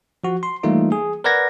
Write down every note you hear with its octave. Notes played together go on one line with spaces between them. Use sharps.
F3 F#4
C6
E3 G3 A3 A#3 D#4 F4
G#4
A#4 B4 D5 F#5 G#6 A#6